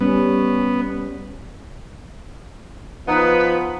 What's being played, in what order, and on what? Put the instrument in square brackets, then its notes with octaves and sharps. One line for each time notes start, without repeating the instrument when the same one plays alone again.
[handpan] G3 C#4 [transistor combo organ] B3
[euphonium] F3 [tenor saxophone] B3 [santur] D#4 [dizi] B4